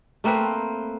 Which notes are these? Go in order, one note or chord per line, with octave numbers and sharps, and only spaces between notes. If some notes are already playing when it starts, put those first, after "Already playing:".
A3 A#3 C4 B4